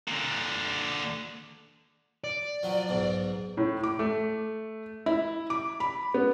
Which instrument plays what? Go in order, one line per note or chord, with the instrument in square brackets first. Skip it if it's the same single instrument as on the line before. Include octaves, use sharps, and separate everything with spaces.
[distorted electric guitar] A#2 D3
D5
[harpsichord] F3 F#3
B1 G#2
[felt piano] A2
D6
A3
E4
D6
B5
B3